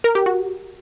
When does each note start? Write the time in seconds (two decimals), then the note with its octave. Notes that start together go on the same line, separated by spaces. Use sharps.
0.04 A#4
0.15 G4
0.26 F#4